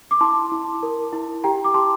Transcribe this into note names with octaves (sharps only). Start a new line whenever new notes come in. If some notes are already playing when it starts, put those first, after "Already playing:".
D6
E4 A5 C6
E4
A#4
E4
G4 G5 A#5
D6
G4 A5 C6